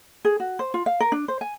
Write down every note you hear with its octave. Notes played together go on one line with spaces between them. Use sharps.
G#4
F#4
C5
F4
F5
A#4
D4
C5
G#5